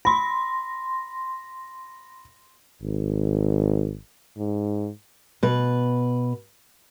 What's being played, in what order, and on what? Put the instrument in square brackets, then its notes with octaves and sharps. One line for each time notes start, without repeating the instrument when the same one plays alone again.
[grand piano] B5 [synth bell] C6 A#6
[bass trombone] G#1
[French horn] G#2
[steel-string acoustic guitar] B2 B4